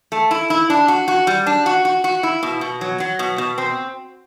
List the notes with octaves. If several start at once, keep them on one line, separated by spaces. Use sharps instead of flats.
A3
E4
E4
D4
F#4
F#4
G3
D4
F#4
F#4
F#4
E4
B2
B2
F#3
F#3
B2
B2
C4